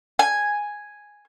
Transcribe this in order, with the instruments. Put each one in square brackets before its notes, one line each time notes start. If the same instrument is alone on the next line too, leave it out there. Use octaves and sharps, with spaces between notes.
[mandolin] G#5